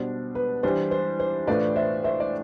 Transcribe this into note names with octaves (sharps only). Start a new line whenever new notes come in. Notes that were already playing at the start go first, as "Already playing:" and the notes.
Already playing: B2 G3 D4 C5
B4
E3 G3 D4 C5
C5
C5
A2 E3 A3 D4 F4 B4 D5
C5 E5
C5 E5
D5